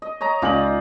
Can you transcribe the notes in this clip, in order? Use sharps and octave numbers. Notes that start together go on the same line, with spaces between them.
D#5
C#5 D#5 A#5
C#2 D#4 F4 D5 G#5 F#7